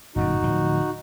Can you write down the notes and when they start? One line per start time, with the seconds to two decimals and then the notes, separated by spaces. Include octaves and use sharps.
0.16 G1 F#2 A#2 D#4 F#4
0.42 D1 F3